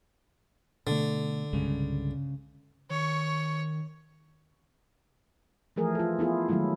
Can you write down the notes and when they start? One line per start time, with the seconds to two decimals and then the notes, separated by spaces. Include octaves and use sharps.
0.87 B2 D3 A3
1.53 C2 G2 C#3 G#3
2.90 D#3 C#5 C#6
5.76 E3 F3 A3 G#4 A#4
5.95 F4 A4
6.19 B3 E4 F4 G#4
6.49 D#3 F#3 G#3 A3 E4